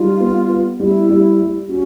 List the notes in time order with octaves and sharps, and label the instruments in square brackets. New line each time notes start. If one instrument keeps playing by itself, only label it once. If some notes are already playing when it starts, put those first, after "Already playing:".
Already playing: [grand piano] G3 D#4 [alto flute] F4
[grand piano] B3
B3
[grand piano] G3 [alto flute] E4
[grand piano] G3
G3
[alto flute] C#4 [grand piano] F#4